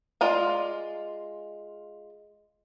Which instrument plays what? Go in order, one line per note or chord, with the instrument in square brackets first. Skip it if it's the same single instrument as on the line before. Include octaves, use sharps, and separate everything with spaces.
[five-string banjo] G#3 F4 D5